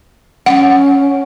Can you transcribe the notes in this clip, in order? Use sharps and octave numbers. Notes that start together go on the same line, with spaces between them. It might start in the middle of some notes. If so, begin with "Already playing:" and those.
C#4 F#5